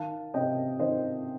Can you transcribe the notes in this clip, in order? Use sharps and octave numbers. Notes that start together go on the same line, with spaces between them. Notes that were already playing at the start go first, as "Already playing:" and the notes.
Already playing: D#3 F5 A5
C3 D#5 G5
D#3 C5 D#5